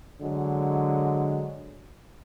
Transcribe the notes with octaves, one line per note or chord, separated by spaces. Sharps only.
D3 F#3 G#3